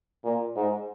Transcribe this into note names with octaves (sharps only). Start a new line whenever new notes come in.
A#2
G#2